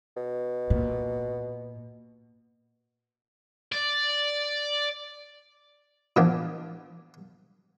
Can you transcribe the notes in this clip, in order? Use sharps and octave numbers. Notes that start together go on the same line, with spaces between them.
B2
A#2
D5
A#2 E3 F3 B3 D4